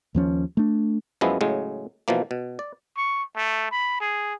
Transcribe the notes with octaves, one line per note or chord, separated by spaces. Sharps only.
D#2 F3 C#4
A3 D4
F#2 F3 G#3 B3 E4
A2 C#3 F#3 G#3
B2 E3 F3 A#3
B2
D5
C#6
A3
B5
G#4